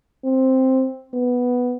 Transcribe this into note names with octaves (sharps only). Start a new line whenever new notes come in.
C4
B3